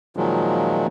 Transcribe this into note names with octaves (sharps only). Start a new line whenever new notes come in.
A#2 D#3 F3 F#3 G#3